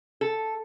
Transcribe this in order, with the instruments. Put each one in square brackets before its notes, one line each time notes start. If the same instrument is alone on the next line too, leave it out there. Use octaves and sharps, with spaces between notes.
[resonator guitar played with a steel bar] A4